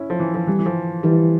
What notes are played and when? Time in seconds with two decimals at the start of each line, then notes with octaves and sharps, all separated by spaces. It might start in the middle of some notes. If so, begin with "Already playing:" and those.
Already playing: C#4 E4
0.10 F3
0.20 E3
0.34 F3
0.47 E3 G3
0.59 E3
0.66 F3
1.03 E3 G3